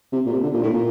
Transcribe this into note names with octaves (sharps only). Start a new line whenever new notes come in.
C3
A#2
C3
D3
A#2
A2
A#2